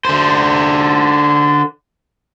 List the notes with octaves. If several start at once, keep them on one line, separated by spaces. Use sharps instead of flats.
D3 C5